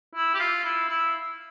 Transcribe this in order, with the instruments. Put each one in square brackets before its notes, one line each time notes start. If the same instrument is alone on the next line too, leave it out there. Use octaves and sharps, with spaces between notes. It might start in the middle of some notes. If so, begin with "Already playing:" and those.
[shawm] E4
G4
F4
E4
E4